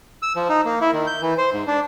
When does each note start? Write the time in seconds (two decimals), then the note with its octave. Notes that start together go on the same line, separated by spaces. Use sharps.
0.22 E6
0.36 F3
0.49 D#4
0.65 A#3
0.81 E4
0.93 D#3
1.07 G6
1.22 E3
1.38 C5
1.53 G#2
1.67 D4